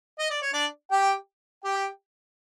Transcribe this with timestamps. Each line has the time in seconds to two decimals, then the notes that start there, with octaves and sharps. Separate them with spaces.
0.18 D#5
0.30 D5
0.42 C#5
0.53 D4 D5
0.91 G4 G5
1.64 G4 G5